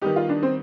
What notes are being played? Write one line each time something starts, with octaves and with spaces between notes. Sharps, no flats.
D#3 G3 B3 D#4 G4
F4
D4
C4